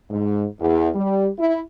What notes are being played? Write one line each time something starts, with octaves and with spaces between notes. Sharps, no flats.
G#2
E2
G3
E4